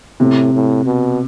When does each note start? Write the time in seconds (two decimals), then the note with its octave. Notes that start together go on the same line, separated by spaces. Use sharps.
0.20 A2 C3
0.53 A2
0.85 B2